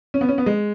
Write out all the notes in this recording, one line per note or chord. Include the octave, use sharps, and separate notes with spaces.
C#4
B3
C#4
B3
G#3